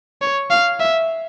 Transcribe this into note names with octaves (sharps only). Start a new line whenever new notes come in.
C#5
F5
E5